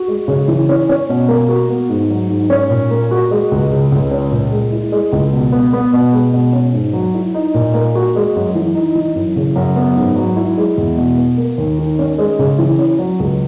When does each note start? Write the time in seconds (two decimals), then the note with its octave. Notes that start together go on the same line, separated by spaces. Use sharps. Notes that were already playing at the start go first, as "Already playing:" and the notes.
Already playing: F#4
0.08 G#3
0.28 C#3
0.48 E3
0.69 C#4
0.89 C#4
1.09 B2
1.28 A#3
1.49 F#4
1.69 B3
1.89 G#2
2.10 F#3
2.30 G#2
2.50 C#4
2.70 A#2
2.91 A#3
3.11 F#4
3.31 G#3
3.52 C#2
3.71 C#3
3.92 C#2
4.11 C#4
4.31 A#2
4.52 G#3
4.72 E4
4.92 G#3
5.12 C#2
5.33 B2
5.52 B3
5.73 B3
5.93 B2
6.13 G#3
6.33 B2
6.53 C#4
6.73 G#2
6.93 F#3
7.14 E4
7.34 D#4
7.54 A#2
7.74 A#3
7.95 F#4
8.16 G#3
8.36 F#2
8.55 E3
8.75 D#4
8.95 E3
9.15 F#2
9.36 C#3
9.56 F#2
9.76 B3
9.97 G#2
10.16 F#3
10.37 E4
10.57 G#3
10.78 E2
10.97 B2
11.18 B3
11.38 A#3
11.58 D#2
11.79 D#3
11.99 C#4
12.18 G#3
12.39 C#3
12.59 E3
12.79 C#4
12.99 F#3
13.20 C#2